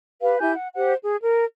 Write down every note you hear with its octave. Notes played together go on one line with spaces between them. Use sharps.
G4 B4 F5
E4 G4 G#5 G6
F#5
G4 C5 F#5
G#4
A#4